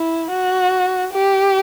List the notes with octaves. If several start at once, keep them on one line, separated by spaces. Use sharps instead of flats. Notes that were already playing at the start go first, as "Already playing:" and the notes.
Already playing: E4
F#4
G4